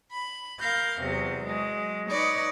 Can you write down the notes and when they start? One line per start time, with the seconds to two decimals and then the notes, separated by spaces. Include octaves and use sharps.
0.12 B5
0.60 A#4 F5 G6
1.02 E2 C3 F#3
1.45 F#3 G#3
2.09 D#4 B4 C#5 D5